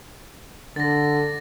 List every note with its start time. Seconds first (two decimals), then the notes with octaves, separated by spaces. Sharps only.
0.76 D3 A6 A#6